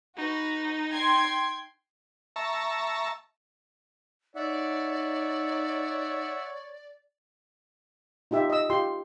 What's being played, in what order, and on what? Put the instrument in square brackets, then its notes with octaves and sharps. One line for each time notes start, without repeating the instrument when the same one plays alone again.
[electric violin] D#4 [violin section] F#4 B4
[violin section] G5 C6 G#6
[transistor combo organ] E5 A5 A#5 C#6
[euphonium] D#4 [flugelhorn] C#5 [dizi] D5 [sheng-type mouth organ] E5 F#5
[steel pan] D#4 F4 G4 E5
D#5 E6
F4 G4 C6